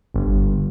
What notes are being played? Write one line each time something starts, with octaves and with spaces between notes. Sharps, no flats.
G1